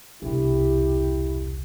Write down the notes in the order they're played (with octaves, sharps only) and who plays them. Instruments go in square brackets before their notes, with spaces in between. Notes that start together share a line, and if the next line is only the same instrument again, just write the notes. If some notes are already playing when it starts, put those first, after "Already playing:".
[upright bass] E1 C2 [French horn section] E4 G4